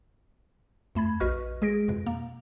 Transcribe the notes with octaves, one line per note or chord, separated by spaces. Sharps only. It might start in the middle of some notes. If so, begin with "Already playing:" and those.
F2 A3 B5 G#6
A#1 F#4 B4 D#5 C#6 F6
G#3 G#4 A#6 D7
F2 B2
A#3